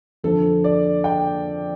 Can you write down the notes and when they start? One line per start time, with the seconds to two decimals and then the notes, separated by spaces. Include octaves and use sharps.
0.24 F2 D3 F3 A4
0.64 D5
1.04 G5